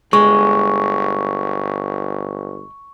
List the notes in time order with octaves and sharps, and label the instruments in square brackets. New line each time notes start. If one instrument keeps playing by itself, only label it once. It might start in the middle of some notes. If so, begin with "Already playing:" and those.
[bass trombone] G1 [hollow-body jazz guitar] G#3 [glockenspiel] C#6